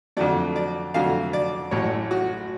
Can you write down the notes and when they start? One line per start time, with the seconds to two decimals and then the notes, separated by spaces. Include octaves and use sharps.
0.17 F2 D3 F#3 A3 D5
0.56 D5
0.94 F2 D3 F#3 A3 F5
1.33 D5
1.71 A1 A2 F#3 C#5
2.11 F#4